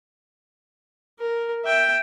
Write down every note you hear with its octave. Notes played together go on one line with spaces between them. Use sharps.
A#4
E5 G5